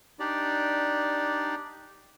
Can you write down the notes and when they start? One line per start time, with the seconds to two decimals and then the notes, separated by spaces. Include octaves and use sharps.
0.19 D4 D#4 G4 D5